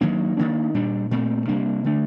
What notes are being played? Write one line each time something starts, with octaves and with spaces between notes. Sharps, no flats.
D#3 F#3 A#3 D4
D#3 F#3 A#3 D4
A#2 G3 D4
A#2 A3 C4
C3 G3 A#3 D4
D3 A3 D4